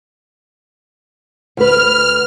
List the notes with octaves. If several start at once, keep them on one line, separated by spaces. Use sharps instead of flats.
D2 B4 F6